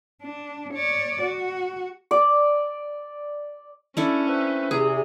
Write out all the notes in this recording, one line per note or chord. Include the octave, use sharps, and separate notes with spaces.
D4
C#5 D5
F#4
D5 D6
C#4 D4 E4 A4
A3 C4 B4
E2 C3 G#4